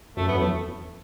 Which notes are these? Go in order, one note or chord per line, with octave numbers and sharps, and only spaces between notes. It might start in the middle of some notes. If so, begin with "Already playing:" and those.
F#2 A3
G2 B3
F#2
E2 A3